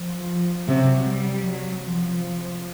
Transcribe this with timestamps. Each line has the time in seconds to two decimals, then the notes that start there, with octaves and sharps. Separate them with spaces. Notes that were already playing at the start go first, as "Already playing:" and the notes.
Already playing: F3
0.68 C3 F#3
1.07 G3
1.46 F#3
1.86 F3